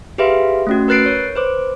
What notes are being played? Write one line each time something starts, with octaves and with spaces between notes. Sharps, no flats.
G4 G#4 B4 E5 F5 C6
A3 C#4 F#4
A#4 B4 F#6 A6 C7 D7
C#5
B4 C5 D6